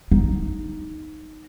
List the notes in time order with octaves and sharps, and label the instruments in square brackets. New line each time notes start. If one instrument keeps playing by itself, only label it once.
[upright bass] D#4